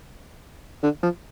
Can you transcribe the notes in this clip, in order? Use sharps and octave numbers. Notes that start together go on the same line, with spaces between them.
D3
F3